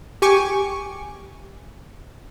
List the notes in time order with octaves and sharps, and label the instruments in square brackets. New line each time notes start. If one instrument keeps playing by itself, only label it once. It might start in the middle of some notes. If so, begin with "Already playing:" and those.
[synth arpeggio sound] G4 G#5 C#6 D6